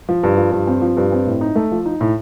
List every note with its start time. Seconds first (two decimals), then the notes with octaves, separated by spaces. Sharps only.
0.09 F3
0.23 G2
0.37 F3
0.52 G2
0.67 C4
0.81 F3
0.97 G2
1.12 C4
1.27 A2
1.41 D#4
1.56 A3
1.72 F3
1.86 D#4
2.01 A2